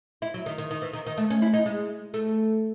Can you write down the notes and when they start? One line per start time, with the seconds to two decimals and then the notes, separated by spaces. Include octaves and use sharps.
0.22 E4
0.34 F#3
0.46 D#3
0.58 D#3
0.71 D#3
0.82 E3
0.93 D#3
1.06 D#3
1.18 A3
1.30 C#4
1.42 E4
1.53 D#4
1.66 G#3
2.14 A3